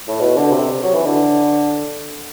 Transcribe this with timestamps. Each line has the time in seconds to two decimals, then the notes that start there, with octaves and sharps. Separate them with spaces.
0.08 A2
0.20 B2
0.37 D3
0.52 C3
0.83 F#3
0.94 E3
1.05 D3